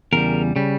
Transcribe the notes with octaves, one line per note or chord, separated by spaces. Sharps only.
E2 C#3 G3 A#4
C#3 G3